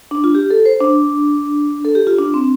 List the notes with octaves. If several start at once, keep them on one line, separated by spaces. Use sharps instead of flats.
D4
F4
G4
A4
C5
D4
A4
G4
F4
D4
C4